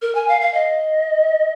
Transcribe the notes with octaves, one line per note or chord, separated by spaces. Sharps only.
A#4
G#5
F5
F5
D#5